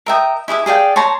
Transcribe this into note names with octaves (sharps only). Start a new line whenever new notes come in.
A#4 E5 G5 D#6
E4 G#4 E5 D6
G#4 D5 F5 G5
C#5 A5 A#5 C6